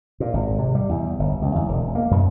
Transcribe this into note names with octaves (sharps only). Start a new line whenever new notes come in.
A#2
G#1
C3
G3
E2
G1
C#2
E2
E1
A#3
F#2